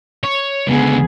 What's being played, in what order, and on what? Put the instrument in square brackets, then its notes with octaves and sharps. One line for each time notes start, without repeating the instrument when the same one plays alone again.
[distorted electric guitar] C#5
[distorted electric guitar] C#2 D3 [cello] B3 G#4